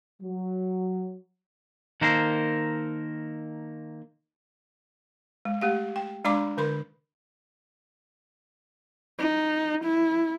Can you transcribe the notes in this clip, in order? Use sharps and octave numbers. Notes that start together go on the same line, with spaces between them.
F#3
D#3 A#3 A4 A#4 C5
G#3
A3 G4 F5
G5
G#3 D4 D5 A#5 B5 D6
D3 A#4 B5 C6
D#4
E4